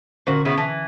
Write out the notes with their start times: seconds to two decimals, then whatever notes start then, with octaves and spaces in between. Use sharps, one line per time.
0.27 A#2 D3 C#4 F#4 C5
0.45 C#3 B3 E4
0.58 E3 A5